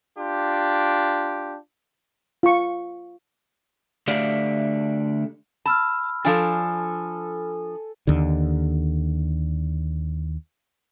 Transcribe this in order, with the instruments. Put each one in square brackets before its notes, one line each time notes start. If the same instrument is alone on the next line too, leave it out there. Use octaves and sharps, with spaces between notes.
[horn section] D4 F4 G4
[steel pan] F4 C#6
[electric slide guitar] D3 A3 G4 D5 E5 F5
[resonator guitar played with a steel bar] A5 [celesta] B5 E6 F6
[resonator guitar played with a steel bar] F3 D4 [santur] A4 G#5
[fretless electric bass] D#2 D3